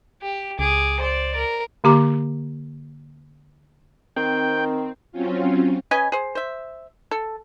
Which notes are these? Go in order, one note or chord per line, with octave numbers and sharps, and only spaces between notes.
G4
C#2 G#4 D6
C5 D5
A#4
D3 A#3 G4 A#5 D6
D#3 C4 G5
F#3 C4 C#4 F4
C#4 B4 D#5 G#5
G#4 C5
C5 E5
A4